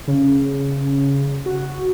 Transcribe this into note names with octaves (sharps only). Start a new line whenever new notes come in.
C#3
F#4